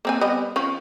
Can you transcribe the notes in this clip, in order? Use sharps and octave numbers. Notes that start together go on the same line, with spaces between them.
A#3 C4 G#5
G3 B3 D#5
F3 C#4